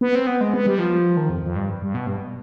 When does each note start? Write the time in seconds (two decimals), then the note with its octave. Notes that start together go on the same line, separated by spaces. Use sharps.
0.01 B3
0.15 C4
0.27 B3
0.41 G#3
0.54 B3
0.66 G3
0.79 F3
1.17 D#3
1.29 F2
1.43 F2
1.56 G2
1.82 G2
1.94 B2
2.07 G2